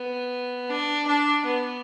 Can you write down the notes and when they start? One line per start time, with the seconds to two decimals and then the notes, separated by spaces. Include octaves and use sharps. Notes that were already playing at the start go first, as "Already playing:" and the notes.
Already playing: B3
0.70 D4
1.07 D4
1.45 B3